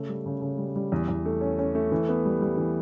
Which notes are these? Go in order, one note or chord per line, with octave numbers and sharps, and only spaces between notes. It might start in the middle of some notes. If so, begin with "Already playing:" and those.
Already playing: C#3 A3
G3
C#3
C#3
G3
G3
E2
E2
A3
C#4
C#4
A3
E3
B3
G3
G3
E3